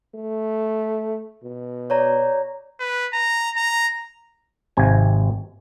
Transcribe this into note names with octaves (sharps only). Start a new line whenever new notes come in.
A3
B2
C#5 D5 A#5
B4
A#5
A#5
G#1 C3 G#5